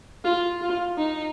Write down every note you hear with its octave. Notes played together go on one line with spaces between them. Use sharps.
F4
F4
D#4